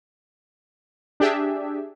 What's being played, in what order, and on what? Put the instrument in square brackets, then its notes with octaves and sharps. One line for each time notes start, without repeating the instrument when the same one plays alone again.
[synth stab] D4 G4 G#4 E5